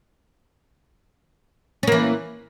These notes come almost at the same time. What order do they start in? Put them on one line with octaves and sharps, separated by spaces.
C#4 A#3 E3